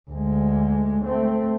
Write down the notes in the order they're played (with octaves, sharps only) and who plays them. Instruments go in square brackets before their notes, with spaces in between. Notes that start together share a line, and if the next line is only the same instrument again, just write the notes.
[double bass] D2 G#3
A3 C4